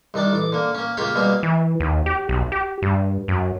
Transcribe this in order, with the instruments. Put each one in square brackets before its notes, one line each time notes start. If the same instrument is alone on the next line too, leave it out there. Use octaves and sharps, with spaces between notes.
[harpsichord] C2 D#3 D4 D5 D6
A1 D6
D3 A#3
A#3 C#4
C#2 A#3 F4 G4 C#5 G5
B2 G3 A#3 C4 G#4
[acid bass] E3
D#2
G4
B1
G4
G2
F#2